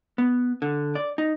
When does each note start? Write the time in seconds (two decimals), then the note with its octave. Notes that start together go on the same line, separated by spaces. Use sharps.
0.18 B3
0.62 D3
0.95 D5
1.18 D#4